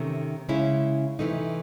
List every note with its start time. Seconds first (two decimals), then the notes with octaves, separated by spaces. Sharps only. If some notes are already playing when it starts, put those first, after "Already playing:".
Already playing: C3 D#3 A3 C#4
0.49 C#3 G#3 C#4 E4
1.19 C3 E3 A3 D#4